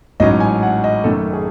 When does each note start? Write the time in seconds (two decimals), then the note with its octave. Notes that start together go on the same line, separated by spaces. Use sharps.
0.20 A1 G#2 F#3 C#4 D#5
0.40 G#5
0.63 F#5
0.84 D#5
1.04 F#2 D#3 A3 C#4 A4
1.33 G#4